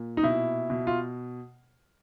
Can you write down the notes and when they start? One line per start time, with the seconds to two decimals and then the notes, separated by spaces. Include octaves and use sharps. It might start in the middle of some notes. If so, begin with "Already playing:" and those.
Already playing: A#2
0.17 D#4
0.23 B2 E4
0.70 B2
0.87 F4